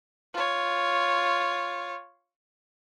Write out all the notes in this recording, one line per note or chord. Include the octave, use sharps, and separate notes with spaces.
F4 C#5